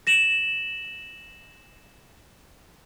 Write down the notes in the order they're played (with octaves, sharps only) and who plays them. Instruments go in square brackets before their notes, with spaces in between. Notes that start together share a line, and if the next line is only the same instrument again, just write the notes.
[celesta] A#6 E7 F#7